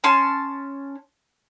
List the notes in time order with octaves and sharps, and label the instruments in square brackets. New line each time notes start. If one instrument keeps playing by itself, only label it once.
[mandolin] C#4 A5 C6